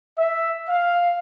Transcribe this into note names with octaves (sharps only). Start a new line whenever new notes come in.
E5
F5